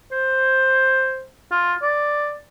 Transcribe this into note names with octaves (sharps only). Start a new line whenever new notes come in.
C5
F4
D5